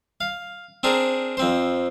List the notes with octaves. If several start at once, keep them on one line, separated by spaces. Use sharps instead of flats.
F5
C4 D4 G#4 A#4
F2 C4 C5